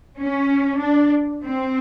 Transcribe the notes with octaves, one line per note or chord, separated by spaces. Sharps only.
C#4
D4
C4